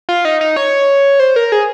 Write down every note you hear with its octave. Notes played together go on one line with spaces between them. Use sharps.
F4
D#4
D#4
C#5
C5
A#4
G#4